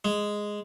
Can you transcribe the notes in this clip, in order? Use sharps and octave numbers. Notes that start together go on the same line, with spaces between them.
G#3